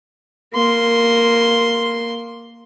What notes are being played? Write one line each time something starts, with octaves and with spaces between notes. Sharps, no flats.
A#3 C6